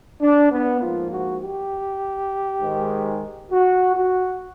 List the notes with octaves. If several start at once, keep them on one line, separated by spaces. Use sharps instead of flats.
D4
B3
G#2 F3 A#3 F4
F#4
G4
G#2 D#3 G#3
F#4
F#4